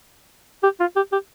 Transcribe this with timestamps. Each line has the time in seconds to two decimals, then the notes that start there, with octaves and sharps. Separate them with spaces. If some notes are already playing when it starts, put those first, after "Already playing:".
0.63 G4
0.80 F4
0.96 G4
1.12 G4